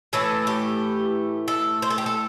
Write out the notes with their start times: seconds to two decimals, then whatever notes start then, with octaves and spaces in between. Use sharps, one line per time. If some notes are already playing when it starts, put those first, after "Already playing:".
0.13 A2 E3 A3 A4
0.47 G4
1.48 A4
1.82 C5
1.90 A4
1.98 G4
2.06 A4